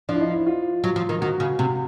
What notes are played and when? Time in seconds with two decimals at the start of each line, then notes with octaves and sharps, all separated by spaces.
0.09 F3 D4
0.15 E4
0.21 D#4
0.33 E4
0.46 F4
0.84 F#3
0.96 F3
1.09 D#3
1.21 D#3 F#4
1.40 C#3
1.59 C3